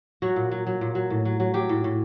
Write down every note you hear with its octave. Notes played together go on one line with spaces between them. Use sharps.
F#3 F#4
A#2
F#3
F#3
A#2
F#3
A2
F#3
F#3
F#3 G4
A2
A2